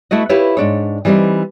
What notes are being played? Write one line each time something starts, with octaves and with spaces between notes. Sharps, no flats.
A3 E4 F#4 D#5
E4 F4 G4 B4 C#5 E5
G#2 D4 C#5
E3 G3 B3 C4 D#4